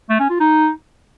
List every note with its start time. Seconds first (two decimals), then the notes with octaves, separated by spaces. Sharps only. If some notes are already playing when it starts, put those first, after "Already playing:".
0.09 A3
0.20 C#4
0.30 F4
0.40 D#4